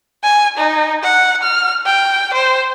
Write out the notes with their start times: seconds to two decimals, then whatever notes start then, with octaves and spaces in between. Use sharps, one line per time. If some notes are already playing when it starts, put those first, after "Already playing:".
0.24 G#5
0.57 D#4
1.03 F#5
1.43 F6
1.86 G5
2.34 C5